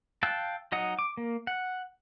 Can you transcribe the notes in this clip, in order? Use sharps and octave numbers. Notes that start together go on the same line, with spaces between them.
F5 G5 A5 E6 F#6
F#3 D#4 D#5 F#5 D#6
D6
A#3
F#5